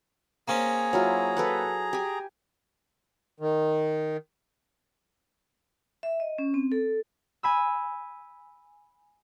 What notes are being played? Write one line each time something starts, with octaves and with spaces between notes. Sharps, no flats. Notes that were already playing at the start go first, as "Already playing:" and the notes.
A#3 C4 C#4 G#4 A#5
F#3 E4 F4
A4 B4 F#5
G4 G#5
D#3
E5
D#5
C#4
C4
A4
G#5 B5 E6